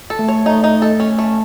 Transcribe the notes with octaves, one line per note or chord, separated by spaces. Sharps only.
A4
A3
C#5
A3 D#4
D#4
A4
C#4
A3